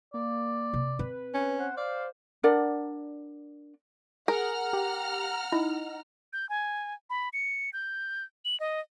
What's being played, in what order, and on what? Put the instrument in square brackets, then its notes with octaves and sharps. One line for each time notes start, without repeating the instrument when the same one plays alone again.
[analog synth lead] A#3 [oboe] D5
[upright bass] C3
[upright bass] C4 [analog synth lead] B4
[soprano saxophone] C#4
[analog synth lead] C5 [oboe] F#5
[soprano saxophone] D5 [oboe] F5
[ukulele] D4 A#4 D5 F#5
[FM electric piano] G#4 [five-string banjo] A#4 [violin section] F#5 A#5 F6
[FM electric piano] G4
[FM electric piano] D#4 [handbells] E4
[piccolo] G6
G#5
B5
C#7
G6
F#7
D#5